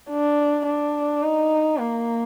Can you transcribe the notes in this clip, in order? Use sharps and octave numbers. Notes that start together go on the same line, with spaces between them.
D4
D4
D#4
A#3